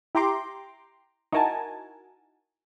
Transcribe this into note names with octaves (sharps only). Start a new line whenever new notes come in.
E4 G4 G5 A#5 C6 D6
D#4 E4 F#4 A#4 G#5 A5